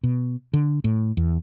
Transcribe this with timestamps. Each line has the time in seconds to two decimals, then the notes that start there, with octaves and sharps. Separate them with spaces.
0.03 B2
0.54 D3
0.84 A2
1.17 E2